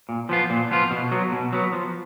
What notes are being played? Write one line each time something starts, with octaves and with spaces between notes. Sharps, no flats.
A#2
F3 B3 F4
A#2
F3 B3 F4
B2
F#3 B3
B2
F#3 B3
F3